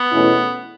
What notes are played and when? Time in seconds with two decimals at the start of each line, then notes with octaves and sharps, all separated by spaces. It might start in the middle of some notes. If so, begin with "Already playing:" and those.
Already playing: B3
0.11 E2 B2 A3 C#4 E4